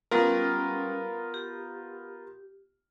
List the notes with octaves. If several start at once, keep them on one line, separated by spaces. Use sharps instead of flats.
G3 B3 C#4 F4 G4 A#4
G4